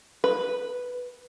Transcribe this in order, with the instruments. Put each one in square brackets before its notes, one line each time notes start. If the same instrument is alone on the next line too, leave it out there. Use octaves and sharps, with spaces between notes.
[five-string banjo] B4